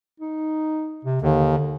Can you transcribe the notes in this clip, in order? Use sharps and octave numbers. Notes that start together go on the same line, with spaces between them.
D#4
C3
D#2 D3